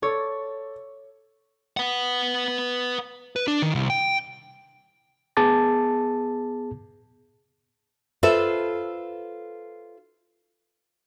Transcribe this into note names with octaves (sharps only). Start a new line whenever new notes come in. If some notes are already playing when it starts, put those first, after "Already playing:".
A4 C#5 D5
B4 F#5
B4
D4
D#3
C2
G5
B3 G#4 A5 D6 A6
F4 A4 B4 C5 E5